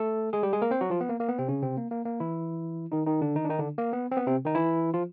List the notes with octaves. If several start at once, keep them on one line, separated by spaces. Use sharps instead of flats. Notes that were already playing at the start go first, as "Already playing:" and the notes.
Already playing: A3 A4
G#3 G#4
G3 G4
G#3 G#4
A#3 A#4
C4 C5
F#3 F#4
F3 F4
B3
A#3
A#3
B3
C3 C4
C#3 C#4
C3 C4
A#3
A#3
A#3
E3 E4
D#3 D#4
D#3 D#4
D3 D4
D#3 D#4
D4
D#3 D#4
D3 D4
A#3
B3
C4
B3
C3 C4
D#3 D#4
E3 E4
F3 F4